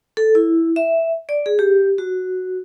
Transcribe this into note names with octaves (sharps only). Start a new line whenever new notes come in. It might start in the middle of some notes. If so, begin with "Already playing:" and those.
A4
E4
E5
D5
G#4
G4
F#4